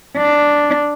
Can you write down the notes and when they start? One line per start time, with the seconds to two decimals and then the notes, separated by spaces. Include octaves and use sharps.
0.18 D4